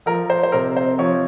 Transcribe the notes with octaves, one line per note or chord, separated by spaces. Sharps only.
F3 A#4
C5
C5
C3 A#4
C5
F3 C#5